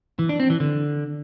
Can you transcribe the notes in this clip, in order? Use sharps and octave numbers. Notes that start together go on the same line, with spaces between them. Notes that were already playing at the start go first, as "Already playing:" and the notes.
E3
D4
C4
E3
D3